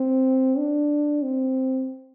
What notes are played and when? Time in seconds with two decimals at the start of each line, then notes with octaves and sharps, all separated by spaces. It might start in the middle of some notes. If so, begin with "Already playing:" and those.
Already playing: C4
0.58 D4
1.23 C4